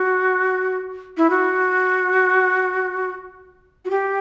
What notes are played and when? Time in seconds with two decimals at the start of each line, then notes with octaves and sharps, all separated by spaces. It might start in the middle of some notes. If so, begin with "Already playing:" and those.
Already playing: F#4
1.17 E4
1.30 F#4
3.85 F#4
3.90 G4